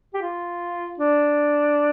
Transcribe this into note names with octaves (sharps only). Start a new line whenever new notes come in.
G4
F4
D4